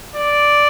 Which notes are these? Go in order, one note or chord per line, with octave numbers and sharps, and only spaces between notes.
D5